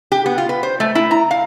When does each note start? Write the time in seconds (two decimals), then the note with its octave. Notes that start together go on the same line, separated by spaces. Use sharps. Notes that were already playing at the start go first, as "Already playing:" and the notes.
0.12 G4
0.26 B3
0.38 F4
0.49 B4
0.63 C5
0.80 A3
0.95 E4
1.11 A#5
1.31 F5